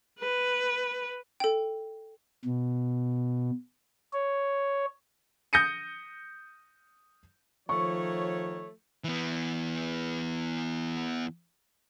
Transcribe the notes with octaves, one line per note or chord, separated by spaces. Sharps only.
B4
A4 G5
B2
C#5
D#6 G6 A#6 C#7 D#7
D#3 F3 A3 C#5 C#6
E3 B3